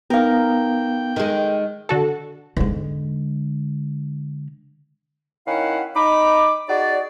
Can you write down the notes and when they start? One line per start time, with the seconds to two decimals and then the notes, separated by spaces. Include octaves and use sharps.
0.10 B3 D#4 A#4 F5 G5
1.16 D#3 G#3
1.89 D3 F#4 A4
2.57 E2 G#2 D3 G#3
5.48 D#3 C#4 E4 F5 F#5
5.96 D#4 B5 D6
6.69 D#4 F#4 G#4 D5